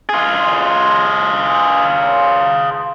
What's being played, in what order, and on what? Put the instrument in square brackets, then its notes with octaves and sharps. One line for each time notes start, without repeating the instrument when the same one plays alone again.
[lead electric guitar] F4 G#4